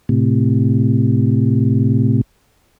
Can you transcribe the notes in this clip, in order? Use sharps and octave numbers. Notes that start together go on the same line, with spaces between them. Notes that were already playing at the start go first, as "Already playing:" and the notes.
A2 C3